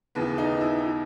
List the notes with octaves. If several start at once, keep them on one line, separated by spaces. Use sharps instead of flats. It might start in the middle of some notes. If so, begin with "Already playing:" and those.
D#2 C#3 E3 B3
D#4
E4
E4